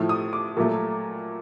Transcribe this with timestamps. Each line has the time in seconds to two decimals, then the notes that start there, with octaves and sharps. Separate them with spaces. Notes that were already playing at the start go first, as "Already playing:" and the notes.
Already playing: A2 F3 A3
0.09 D#6
0.33 D6
0.57 A#2 F#3 A3